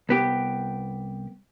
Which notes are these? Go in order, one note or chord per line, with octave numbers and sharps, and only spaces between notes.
C2 B3 G4